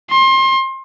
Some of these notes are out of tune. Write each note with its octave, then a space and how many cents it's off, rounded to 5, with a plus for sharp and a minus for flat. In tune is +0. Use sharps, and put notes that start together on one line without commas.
C6 +30